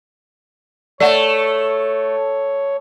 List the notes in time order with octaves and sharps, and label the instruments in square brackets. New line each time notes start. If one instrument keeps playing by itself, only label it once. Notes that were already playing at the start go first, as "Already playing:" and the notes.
[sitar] A3 [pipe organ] C#5 [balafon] D5 F#5